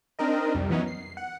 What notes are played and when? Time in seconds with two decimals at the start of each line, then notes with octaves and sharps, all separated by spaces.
0.19 C4 D4 D#4 A#4 D#5
0.55 C2 F2 G3
0.70 E3 F#3 B3 C#4 D#4
0.87 C7
1.17 F#5